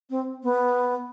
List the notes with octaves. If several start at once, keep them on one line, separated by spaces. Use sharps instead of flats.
C4
B3